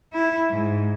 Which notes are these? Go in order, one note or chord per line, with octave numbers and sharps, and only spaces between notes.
E4
G#2